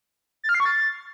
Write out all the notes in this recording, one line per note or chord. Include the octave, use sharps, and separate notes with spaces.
A6
F6
C7
C#6
A6